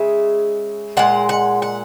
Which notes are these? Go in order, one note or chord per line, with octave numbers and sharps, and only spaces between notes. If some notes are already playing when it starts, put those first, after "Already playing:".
Already playing: C#3 G#3 E5
A#2 G#3 F#5
F#5
F#5